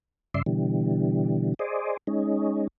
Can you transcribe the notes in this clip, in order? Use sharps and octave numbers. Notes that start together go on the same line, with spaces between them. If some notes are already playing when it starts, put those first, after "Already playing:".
G2 C#3 D5 E5 C6
B2 D3 E3 G3
G#4 C5 D5 D#5
G#3 C#4 D#4